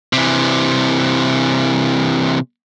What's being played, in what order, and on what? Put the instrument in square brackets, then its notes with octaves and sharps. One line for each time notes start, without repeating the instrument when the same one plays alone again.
[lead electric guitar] C3 E3